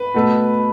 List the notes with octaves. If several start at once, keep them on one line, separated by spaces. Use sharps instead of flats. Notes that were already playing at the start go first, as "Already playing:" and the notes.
Already playing: B4
B2 A3